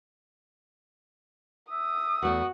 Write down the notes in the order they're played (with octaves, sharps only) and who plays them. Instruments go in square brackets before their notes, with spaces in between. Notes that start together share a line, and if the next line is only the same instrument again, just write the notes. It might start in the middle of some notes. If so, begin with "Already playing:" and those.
[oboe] E5 [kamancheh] D#6
[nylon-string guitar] E2 A3 [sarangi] F#4